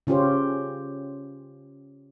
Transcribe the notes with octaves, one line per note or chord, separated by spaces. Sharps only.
C#3 C#4 F4 G4 C5